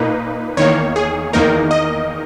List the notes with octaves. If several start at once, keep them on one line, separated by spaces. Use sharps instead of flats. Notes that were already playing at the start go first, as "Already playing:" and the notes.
Already playing: A#2 A#3 D#4 B4
E2 D#3 A#3 C#5
G#4
E2 D#3 A#3 D#4 A#4
D#5